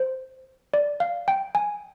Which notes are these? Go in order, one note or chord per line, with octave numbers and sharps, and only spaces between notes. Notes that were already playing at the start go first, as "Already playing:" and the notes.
Already playing: C5
D5
F5
G5
G#5